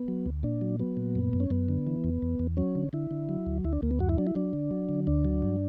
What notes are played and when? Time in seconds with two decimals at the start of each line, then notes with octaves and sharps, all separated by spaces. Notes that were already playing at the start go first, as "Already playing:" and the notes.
Already playing: B3
0.08 F#3
0.26 D2
0.43 A#2 D4
0.61 F#3
0.79 F#3 B3
0.97 A#2
1.15 F#2
1.33 F#2
1.40 C#4
1.50 F#2 B3
1.68 D3
1.87 E3
2.04 E2
2.22 E2
2.39 E2
2.57 F#3 C#4
2.75 D3
2.93 D3 E4
3.11 D3
3.29 F#3
3.46 D2
3.64 D2 E4
3.73 D4
3.82 D2 A#3
3.91 B3
3.99 F#2 F#4
4.09 E4
4.18 F#3 D4
4.27 E4
4.35 F#3 D4
4.53 D3
4.71 F#3
4.89 D3
5.07 D2 D4
5.25 F#3
5.42 G2